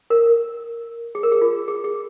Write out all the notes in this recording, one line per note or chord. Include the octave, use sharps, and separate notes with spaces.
A#4
G#4
A#4
G#4
F4
G#4
G#4